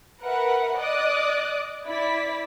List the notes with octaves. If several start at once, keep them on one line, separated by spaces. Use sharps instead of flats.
A#4 B4 E5 F#5
D5 D#5 D6 D#6 F#6
E4 D5 B6